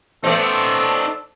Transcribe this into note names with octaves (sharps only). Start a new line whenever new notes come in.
A3 B3 C4 D#4 A4 D5